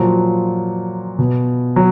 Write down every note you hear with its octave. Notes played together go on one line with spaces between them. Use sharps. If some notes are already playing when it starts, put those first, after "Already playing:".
Already playing: A#2 F3 F#3
B2
F#3